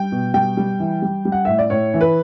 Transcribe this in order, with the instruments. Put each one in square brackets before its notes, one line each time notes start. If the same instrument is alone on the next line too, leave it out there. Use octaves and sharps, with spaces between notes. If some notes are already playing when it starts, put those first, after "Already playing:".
Already playing: [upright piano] G3 G5
B2
G3 G5
G3
E3
G3
G3
F#5
A2 E5
D5
A2 C#5
E3
B4